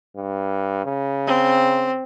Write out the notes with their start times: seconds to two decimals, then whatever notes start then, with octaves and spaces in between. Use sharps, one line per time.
0.17 G2
0.85 C#3
1.27 C4